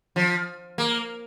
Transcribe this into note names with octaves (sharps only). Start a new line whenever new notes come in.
F3
A#3